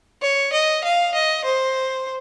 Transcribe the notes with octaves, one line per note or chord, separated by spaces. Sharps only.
C#5
D#5
F5
D#5
C5